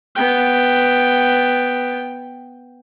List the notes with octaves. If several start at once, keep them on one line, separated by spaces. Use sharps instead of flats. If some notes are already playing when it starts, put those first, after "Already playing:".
B3 G5